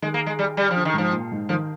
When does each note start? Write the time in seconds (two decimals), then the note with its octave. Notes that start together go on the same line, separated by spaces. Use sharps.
0.02 D#3 G#3
0.14 A#3
0.26 G#3
0.39 G3
0.57 G3
0.71 F3
0.76 D3
0.85 D#3
0.94 G#2 F3
1.12 A#2
1.32 G#2
1.49 D#3 F3